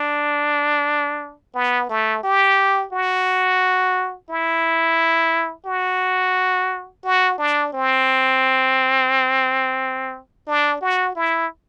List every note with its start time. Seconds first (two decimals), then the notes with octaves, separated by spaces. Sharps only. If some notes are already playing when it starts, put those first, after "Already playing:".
Already playing: D4
1.54 B3
1.89 A3
2.24 G4
2.92 F#4
4.30 E4
5.66 F#4
7.04 F#4
7.38 D4
7.73 C4
10.47 D4
10.81 F#4
11.16 E4